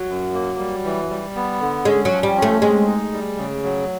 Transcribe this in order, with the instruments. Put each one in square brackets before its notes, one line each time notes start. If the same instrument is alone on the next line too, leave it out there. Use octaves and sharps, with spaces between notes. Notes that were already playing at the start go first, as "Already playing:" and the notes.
Already playing: [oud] F#3
[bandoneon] F#2
A#3
G3
E3
G3
B3
D3
[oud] G#3 [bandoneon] C#4
[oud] F#3
[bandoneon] F3
[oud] G3
[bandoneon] C#4
[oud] A3
[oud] G#3 [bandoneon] C4
[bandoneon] D#4
G3
C#3
F#3